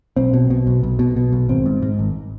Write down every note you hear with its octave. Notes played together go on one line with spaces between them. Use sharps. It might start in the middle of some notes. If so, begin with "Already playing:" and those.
B1 C4
B2
B2
B1
B1
B2
B2
B1
G#1 C4
G#2
G#2
G#1